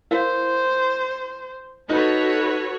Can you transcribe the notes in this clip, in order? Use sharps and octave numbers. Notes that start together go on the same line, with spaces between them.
E4 A#4 C5 F5
D#4 F#4 A4 B4 C#5